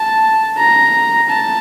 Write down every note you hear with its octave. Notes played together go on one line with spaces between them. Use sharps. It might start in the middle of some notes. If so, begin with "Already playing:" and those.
Already playing: A5
A#5
A5